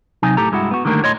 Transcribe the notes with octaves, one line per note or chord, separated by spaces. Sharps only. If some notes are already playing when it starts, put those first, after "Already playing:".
C3 F#3 D#4 G#5
A2 G4 A4 A#5
G2 G#3 E4 F#4
B3 F#4
D3 D#3 G3 A3 A#3 A#4
A2 C#5 D#5 C6